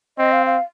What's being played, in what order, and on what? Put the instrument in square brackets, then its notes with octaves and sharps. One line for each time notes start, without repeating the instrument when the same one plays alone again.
[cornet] C4 [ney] D#5
[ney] F5
F5